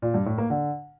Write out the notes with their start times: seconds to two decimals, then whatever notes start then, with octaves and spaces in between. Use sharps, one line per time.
0.02 A#2
0.14 G2
0.26 A2
0.38 A#3
0.50 D3